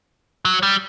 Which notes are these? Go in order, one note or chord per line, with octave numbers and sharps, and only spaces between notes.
F#3
G3